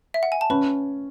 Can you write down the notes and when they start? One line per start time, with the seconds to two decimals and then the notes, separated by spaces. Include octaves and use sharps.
0.14 E5
0.23 F#5
0.32 G#5
0.41 A5
0.50 C#4 B4 B5